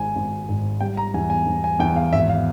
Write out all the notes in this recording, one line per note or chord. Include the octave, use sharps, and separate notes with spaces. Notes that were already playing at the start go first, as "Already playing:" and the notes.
Already playing: G#1 G#2 G#5
G#1
G#2
G3 G5
A#5
E2 G#5
G#5
E2
G#5
E2 G5
F5
G#1 E5
F5